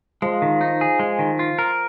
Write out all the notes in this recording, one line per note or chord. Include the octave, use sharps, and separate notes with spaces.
F3 G#3
D#3
D#4
G#4
G#3
D#3
F4
A#4